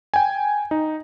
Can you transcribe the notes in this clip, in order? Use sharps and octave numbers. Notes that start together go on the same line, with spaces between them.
G5 G#5
D#4